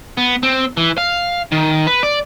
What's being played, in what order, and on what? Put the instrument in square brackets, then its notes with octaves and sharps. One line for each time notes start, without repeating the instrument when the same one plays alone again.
[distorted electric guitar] B3
C4
E3
F5
D#3
B4
D5